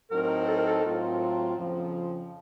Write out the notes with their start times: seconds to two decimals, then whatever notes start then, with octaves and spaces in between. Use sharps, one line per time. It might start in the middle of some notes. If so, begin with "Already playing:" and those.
0.11 A2 F#3 C4 D#4 A#4
0.48 A4
0.57 A#4
0.67 A4
0.84 A2 F#3 C4 F4
1.56 F2 C#3 F3